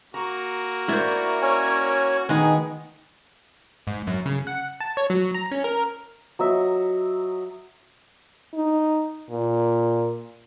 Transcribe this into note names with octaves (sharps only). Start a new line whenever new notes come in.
A#3 F#4 A#5
E4 A#4 C5 D5 E5
C#4 C#5 G#5
D2 D#3 G#3 B3 D#4 G#4 G#5
G#2
F#2
C#3
F#5
A5
C#5
F#3
A#5
C#4
A#4
F#3 D#5 E5
D#4
A#2